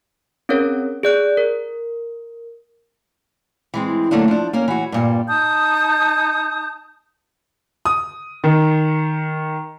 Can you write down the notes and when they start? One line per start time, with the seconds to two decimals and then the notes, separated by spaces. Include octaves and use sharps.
0.49 C4 C#4 G#4 A#4 C#5
1.03 G#4 D5 F#6
1.37 A#4
3.74 E3 G#3 C4
4.11 D3 F#3 A3 A#3 D4
4.28 F3 D4
4.53 A#3 C#4 A#4
4.68 E3 F#4
4.92 G2 A#2 G3
5.27 D#4 A5 D#6 G6
7.85 D#6
8.44 D#3